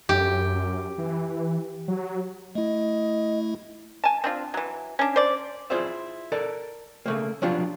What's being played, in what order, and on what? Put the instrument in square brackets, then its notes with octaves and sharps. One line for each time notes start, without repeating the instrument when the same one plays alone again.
[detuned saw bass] F#2 [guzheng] G4
[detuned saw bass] E3
F#3
[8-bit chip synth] A3 E4 [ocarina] D#5
[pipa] G#5 A5
C4 D4 F4
E3 F#3
C#4 D4
C5 D5
[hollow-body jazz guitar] E4 F4 G#4 C5 D5 E5
A4 A#4 D5
C#3 A3 A#3
F3 F#3 B3 D4 F4 G4